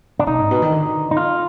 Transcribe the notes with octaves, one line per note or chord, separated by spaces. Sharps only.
D4
B2 D#4
G#2
B2
D#3
D3
D#4
F4